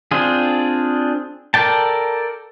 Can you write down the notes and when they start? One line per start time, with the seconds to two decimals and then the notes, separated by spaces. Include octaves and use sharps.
0.12 C4 D4 F4 G#4
1.54 A4 A#4 D5 G5 A5